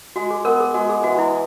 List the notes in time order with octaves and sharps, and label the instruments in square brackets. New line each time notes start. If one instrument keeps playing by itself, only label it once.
[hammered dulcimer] G#3 [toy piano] F#4
[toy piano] G#4
[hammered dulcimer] B3 [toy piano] A#4
[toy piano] G#4
[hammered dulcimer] G#3 [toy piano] F#4
[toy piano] G#4
[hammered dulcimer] E3 [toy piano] F#4
[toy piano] E4